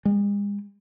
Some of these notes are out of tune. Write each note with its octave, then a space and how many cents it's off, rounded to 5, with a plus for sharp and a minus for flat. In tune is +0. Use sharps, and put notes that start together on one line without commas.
G#3 -40